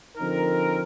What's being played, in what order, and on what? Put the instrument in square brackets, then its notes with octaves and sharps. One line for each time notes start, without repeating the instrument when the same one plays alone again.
[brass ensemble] D3 F3 C4 D#4 A#4